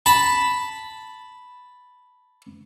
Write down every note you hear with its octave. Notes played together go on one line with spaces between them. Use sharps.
A5 B5